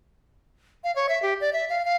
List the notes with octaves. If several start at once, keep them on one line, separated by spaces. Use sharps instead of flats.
F5
C#5
E5
G4
D5
E5
F5
F5